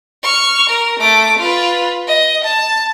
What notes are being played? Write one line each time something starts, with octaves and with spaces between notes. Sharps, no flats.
C#6 F6
A#4
A3 D6
F4 B4
D#5
A5